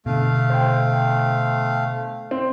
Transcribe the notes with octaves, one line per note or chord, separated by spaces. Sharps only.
B2 D3 A3 F5
C5 G5
C4